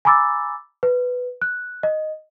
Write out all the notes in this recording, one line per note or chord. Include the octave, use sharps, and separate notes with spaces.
G#5 A#5 B5 D6 E6 A6
B4
F#6
D#5